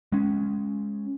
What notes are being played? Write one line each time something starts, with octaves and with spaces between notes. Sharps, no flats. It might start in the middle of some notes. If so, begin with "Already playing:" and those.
G#3 C#4